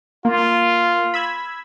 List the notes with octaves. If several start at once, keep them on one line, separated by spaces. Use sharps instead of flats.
A#3 F4
B5 E6 G#6